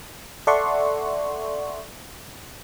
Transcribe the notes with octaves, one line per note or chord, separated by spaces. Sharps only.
A4 D5 E5 F#5 C6 C#6